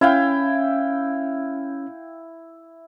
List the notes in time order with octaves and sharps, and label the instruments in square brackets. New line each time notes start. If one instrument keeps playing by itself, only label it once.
[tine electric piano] C#4 [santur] E4 F5 G5